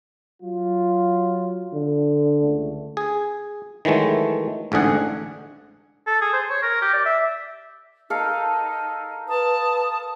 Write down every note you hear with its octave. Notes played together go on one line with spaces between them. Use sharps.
F#3 F4
D3
C#2 A3
G#4
D#3 E3 F#3 G#3 A3
A1 G#2 D3 G#4 F#5
A4
G#4
C5
C#5
A#4
G4
D5
E5
D#4 A4 A#4 F5
B4 A5 D#6